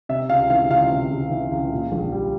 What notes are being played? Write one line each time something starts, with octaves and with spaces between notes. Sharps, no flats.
C3 E5
C#2 F5
E3 F5
C#2 F5
C3
C#2
E3
C#2
A#2
A#1
G3